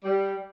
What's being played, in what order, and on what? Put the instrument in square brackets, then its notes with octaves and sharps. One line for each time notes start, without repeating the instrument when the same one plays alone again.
[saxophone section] G3